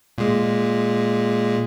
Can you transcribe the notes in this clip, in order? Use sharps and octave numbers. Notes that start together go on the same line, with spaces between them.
A#2 G#3